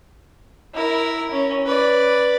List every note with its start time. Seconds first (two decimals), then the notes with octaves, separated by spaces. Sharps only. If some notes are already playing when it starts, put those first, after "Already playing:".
0.74 E4 A#4
1.31 C#4
1.66 B4 D5